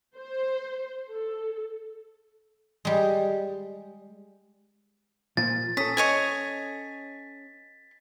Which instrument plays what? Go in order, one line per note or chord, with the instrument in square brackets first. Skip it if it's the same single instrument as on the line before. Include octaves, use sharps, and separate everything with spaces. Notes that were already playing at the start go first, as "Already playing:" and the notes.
[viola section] C5
A4
[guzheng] G3 G#3
[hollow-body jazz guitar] A#2 F3 [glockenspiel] A6
[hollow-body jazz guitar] C#4 A4 [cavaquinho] D#6 [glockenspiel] B6
[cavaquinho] C#5 D#5 G#5